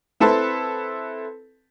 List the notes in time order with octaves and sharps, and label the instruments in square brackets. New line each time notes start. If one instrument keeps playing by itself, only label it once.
[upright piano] C4 E4 A4 B4 A5 C6